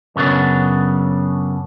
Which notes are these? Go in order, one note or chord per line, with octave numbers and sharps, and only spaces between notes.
F#2 C#3 F#3 B3 D4